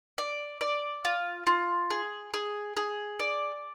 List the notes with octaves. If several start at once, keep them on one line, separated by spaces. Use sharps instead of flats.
D5
D5
F4
F4
G#4
G#4
G#4
D5